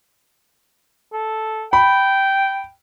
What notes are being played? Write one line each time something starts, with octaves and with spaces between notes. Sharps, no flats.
A4
G5 B5